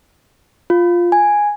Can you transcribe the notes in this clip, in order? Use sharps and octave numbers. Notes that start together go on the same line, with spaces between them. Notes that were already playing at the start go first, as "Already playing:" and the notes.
F4
G#5